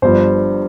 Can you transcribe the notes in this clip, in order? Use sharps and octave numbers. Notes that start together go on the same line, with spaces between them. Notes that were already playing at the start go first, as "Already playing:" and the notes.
G1 G2 F3 C5